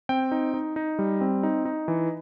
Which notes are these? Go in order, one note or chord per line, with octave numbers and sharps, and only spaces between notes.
C4 G5
D#4
D#4
D#4
G3
C4
D#4
D#4
E3